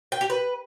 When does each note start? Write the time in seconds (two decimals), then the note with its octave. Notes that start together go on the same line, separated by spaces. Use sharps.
0.12 G5
0.21 G4
0.30 B4